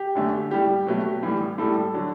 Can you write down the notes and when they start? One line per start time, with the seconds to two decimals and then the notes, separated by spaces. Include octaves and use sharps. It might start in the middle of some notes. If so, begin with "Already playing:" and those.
Already playing: G4
0.15 F#2 D3 A3
0.51 A2 G3 G4
0.87 B2 F#3 A3
1.23 A2 E3 G3
1.58 A2 G3 A4
1.94 D3 F#3